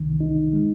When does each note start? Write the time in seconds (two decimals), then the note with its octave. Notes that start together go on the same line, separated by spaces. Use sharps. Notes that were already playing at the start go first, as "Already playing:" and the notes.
Already playing: C2 D#3
0.20 D#4
0.53 G#3